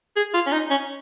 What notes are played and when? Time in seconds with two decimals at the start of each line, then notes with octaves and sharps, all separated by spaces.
0.16 G#4
0.34 F4
0.47 C#4
0.52 D#4
0.70 C#4